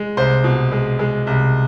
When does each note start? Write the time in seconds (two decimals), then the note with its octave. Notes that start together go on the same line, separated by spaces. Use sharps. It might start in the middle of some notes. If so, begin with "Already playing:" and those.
Already playing: G#3
0.17 C2 C5
0.44 B2
0.72 G#3
0.99 G#3
1.27 C2